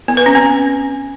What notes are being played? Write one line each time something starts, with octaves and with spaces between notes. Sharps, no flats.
B3
B4
C#4
C4